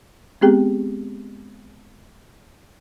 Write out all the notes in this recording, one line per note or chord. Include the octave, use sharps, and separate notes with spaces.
G#3 B3 C4 G4 G#4 G5